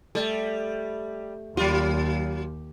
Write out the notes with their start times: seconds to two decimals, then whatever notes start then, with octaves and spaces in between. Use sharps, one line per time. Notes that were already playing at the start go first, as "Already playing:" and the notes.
0.15 G3 A3
1.57 D#2 F#3 F4 G4